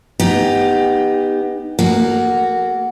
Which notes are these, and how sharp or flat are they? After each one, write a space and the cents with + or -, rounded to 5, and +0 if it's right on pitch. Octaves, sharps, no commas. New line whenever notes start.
B3 +0 D#4 +0 G4 +20
A#3 -5 F#4 +0 A4 -45